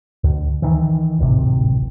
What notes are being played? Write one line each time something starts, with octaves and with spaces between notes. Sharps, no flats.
D2
D#3 E3
D1 G#1 C3